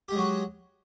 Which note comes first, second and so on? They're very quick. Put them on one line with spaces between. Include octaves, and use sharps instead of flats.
G4 G#3 F#3 F#4